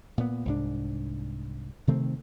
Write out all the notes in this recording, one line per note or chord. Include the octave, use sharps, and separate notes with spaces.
A#2 B3
C2 G#2 D4
C3 D#3 A3 C4